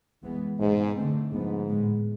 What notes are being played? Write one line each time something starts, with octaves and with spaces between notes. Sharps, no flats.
E3 G#3 B3
G#2 B2 G#3 B3
D3 A3 C4
G#2 D3 F3 B3
A2 G#3 B3